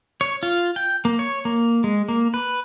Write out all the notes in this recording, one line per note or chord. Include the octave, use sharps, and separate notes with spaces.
C#5
F4
G5
A#3
C#5
A#3
G#3
A#3
B4